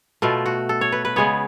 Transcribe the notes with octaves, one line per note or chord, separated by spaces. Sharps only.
B2 A3 F4
F#4
A4
C#5
B4
B4
C#3 G#3 B3 C#5